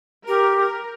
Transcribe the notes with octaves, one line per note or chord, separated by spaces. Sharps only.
G4 A#4
A#4